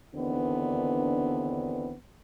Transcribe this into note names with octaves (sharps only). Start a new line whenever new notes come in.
D#2 D3 E3 B3 C4 D4